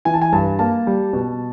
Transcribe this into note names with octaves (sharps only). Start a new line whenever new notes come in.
E3 G#5
A5
G#5
G2 A5
A#3 A5
G3
B2